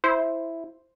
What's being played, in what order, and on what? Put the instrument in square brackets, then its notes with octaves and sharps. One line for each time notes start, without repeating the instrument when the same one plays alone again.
[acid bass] E4 [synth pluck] C5